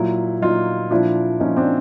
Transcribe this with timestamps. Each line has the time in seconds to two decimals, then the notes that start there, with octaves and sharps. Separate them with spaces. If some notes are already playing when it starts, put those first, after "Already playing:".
Already playing: A#2 F#3 E4
0.42 A#2 F#3 D#4 F4
0.91 A#2 F3 D4 E4
1.40 A#2 F3 C#4 D#4
1.56 C4 D4